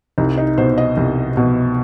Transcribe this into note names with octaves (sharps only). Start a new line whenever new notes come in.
C2 D#4
D#4
B2 C5
D#5
C2
B2